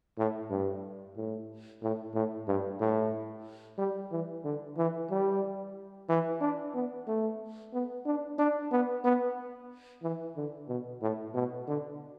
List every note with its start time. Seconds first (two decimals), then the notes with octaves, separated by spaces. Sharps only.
0.18 A2
0.50 G2
1.17 A2
1.82 A2
2.14 A2
2.48 G2
2.80 A2
3.78 G3
4.12 E3
4.44 D3
4.77 E3
5.10 G3
6.09 E3
6.41 D4
6.75 B3
7.07 A3
7.73 B3
8.06 D4
8.39 D4
8.71 B3
9.04 B3
10.03 E3
10.36 D3
10.68 B2
11.02 A2
11.34 B2
11.68 D3